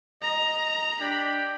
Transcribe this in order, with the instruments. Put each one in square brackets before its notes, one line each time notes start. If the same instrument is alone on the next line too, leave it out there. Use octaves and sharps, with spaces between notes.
[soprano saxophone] D#5 [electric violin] A#5
[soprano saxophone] D4 [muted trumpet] G4 [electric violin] B5